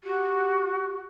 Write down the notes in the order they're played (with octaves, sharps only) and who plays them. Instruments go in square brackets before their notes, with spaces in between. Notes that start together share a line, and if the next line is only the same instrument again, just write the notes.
[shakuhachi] F#4 [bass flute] G4